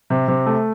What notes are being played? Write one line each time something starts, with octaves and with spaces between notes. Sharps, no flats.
C3
C3
A3